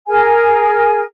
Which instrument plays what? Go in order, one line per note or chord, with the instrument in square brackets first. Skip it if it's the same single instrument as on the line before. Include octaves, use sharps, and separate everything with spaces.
[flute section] G#4 A#4 G#5